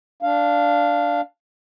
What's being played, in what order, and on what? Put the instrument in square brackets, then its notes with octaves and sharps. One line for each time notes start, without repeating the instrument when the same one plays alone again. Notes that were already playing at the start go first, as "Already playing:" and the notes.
[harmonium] D4 F5